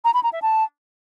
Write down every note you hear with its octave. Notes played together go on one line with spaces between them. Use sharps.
A#5
B5
A#5
E5
A5